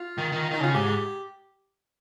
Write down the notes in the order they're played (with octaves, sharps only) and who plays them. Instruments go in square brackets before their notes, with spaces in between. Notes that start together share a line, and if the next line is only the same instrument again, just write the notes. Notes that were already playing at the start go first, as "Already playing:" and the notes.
Already playing: [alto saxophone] F4
[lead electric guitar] D#3
D#3
[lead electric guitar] D#3 [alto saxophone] D#4
[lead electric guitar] C#3 [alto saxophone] F4
[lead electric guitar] G#2 [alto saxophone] G4